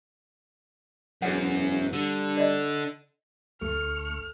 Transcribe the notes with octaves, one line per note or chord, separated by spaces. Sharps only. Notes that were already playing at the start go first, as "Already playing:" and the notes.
E1 F#2 G#4 C#5 F#5
D3 G3
D5 D#5
D2 A3 C#6 F6